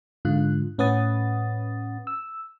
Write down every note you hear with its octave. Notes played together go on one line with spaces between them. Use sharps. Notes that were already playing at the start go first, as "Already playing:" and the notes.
G#2 D3 F4 F#6
A2 C#4 B4 F#5 D#6 A6
E6